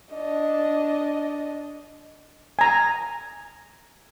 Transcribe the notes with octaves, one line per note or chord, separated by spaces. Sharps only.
D4 D#5
G#5 A#5